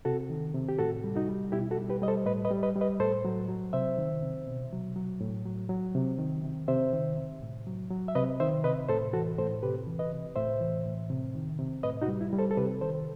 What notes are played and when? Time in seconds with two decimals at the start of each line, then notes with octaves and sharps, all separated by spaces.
0.05 C3 F#4 A4
0.30 D#3
0.54 C3
0.69 G4
0.78 A2 F#4 A4
1.04 G3
1.16 D#4 F#4
1.29 G3
1.52 B2 E4 G4
1.71 F#4 A4
1.78 G3
1.90 G4 B4
2.02 G3 D#5
2.08 A4 C5
2.26 A2 B4 D#5
2.45 B4 D#5
2.51 G3
2.63 B4 D#5
2.76 G3
2.81 B4 D#5
3.00 A2 A4 C5
3.25 F#3
3.49 F#3
3.73 C3 C5 E5
3.98 D#3
4.22 C3
4.47 B2
4.72 F#3
4.96 F#3
5.21 A2
5.46 F#3
5.69 F#3
5.94 C3
6.18 D#3
6.43 C3
6.68 C3 C5 E5
6.93 D#3
7.17 C3
7.42 A2
7.67 F#3
7.90 F#3
8.08 E5
8.15 C3 B4 D#5
8.40 D#3 C5 E5
8.64 C3 B4 D#5
8.88 A2 A4 C5
9.13 E3 F#4 A4
9.38 A2 A4 C5
9.63 C3 G4 B4
9.87 E3
9.99 B4 D#5
10.12 C3
10.36 A2 C5 E5
10.60 E3
10.86 A2
11.10 C3
11.35 D#3
11.59 C3
11.83 A2 B4 D#5
12.02 D#4 F#4
12.08 G3
12.21 E4
12.33 G3
12.39 A4 C5
12.51 A4
12.57 C3 G4 B4
12.81 D#3 A4 C5